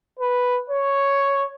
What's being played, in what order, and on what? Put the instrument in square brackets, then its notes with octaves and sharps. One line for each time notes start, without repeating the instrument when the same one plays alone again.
[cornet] B4
C#5